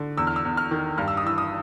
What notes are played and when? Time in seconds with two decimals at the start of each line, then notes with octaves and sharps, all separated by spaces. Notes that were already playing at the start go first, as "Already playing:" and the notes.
Already playing: D3
0.17 E2 E6
0.27 F6
0.36 E6
0.45 E2
0.57 F6
0.71 D#3
0.98 G2 F6
1.08 E6
1.17 D#6
1.25 E3 E6
1.38 D#6